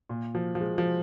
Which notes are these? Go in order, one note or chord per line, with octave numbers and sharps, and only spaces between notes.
A#2
F3
F3
G#3
F3